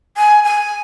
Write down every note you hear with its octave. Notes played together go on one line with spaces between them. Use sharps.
G#5
G#5